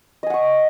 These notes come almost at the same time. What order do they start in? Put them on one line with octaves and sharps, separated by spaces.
D#5 G#5 F#5 C#6